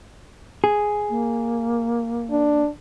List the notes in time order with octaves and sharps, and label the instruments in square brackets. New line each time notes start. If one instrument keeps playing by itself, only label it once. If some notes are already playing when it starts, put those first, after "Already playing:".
[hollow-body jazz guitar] G#4
[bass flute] A#3
[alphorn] D4